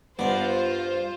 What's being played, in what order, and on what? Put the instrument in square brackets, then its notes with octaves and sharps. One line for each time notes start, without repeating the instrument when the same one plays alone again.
[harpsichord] G2 D4 D5 [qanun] B3 [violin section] F4 C5